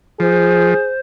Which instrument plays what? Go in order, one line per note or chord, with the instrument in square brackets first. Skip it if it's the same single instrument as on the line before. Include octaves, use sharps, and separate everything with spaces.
[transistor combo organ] F3 [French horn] G#4 [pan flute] C5